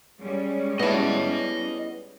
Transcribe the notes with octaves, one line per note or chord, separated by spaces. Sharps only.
G3 G#3 C#4
B3 E4 D#5 A5